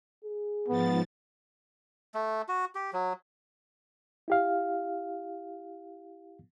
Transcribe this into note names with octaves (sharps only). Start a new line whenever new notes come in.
G#4
G#2 F3 B3 A6
A3
F#4
G4
F#3
E4 G4 F5